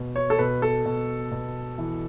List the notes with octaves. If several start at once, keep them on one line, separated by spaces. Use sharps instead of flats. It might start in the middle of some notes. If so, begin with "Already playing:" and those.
Already playing: B2
C#5
A4
B2 B4
A4
B2
B2
E3